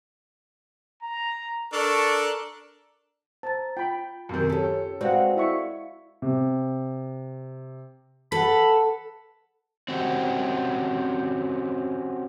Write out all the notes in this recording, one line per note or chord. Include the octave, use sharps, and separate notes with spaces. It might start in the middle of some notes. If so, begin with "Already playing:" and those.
A#5
D4 A4 A#4 C#6
C5 A5 A#5 A6
F4 G5 B5
F#2 C3 D#3
C#4 G4 A4
G#3 C4 F#4 B4 D5 F5 F#5
E4 E5 C#6
C3
A4 B4 F#5 B5
C4 C#4 F#4 G4